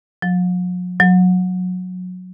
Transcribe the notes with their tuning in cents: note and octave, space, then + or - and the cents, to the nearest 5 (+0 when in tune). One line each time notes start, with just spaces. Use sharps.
F#3 -45
F#3 -20